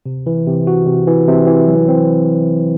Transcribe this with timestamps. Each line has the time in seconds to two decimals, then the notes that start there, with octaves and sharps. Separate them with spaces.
0.06 C3
0.26 E3
0.47 C3
0.67 F#4
0.87 C3
1.07 E3
1.28 C3
1.48 E3
1.67 F#3
1.88 C4